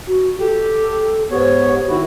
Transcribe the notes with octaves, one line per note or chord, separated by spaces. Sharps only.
F#4
G4 A4
G#2 B3 G4 C#5
D#3 D#4 E4 F#4